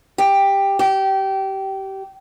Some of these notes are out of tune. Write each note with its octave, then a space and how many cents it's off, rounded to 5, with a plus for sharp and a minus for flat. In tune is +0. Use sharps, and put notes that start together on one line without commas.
G4 +10
G4 -20